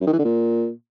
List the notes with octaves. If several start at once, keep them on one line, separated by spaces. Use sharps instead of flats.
F#2
D#3
E3
D3
A#2